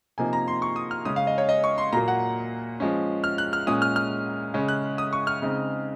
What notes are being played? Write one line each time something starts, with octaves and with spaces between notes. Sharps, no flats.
C3 F3 A#3 D#4 G#5
A#5
C6
C#6
D#6
F6
C#3 G#3 C#4 D#6
F5
D#5
C#5
D#5
C#6
C6
A#2 F#3 A#3 A#5
F#5
F3 G#3 C#4
F6
F#6
F6
A#2 G#3 C#4 D#6
F6
F6
C#3 G#3 C#4
F#6
D#6
C#6
F6
C#3 G#3 C4 D#4